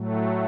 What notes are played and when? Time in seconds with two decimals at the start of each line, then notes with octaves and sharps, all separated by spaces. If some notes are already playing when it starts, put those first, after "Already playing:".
Already playing: A2 F#3 A3